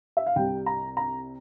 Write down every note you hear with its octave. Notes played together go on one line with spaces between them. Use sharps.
E5
F5
C2 C3 G3 G5
A#5
A#5